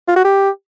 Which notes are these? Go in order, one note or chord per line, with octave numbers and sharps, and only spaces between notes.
F4
F#4
G4